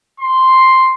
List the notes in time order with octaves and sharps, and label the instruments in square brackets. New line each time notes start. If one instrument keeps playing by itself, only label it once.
[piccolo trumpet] C6